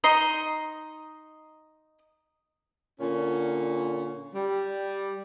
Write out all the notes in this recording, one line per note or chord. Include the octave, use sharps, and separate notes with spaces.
D#4 D#5 C6
A#2 D3 C#4
G3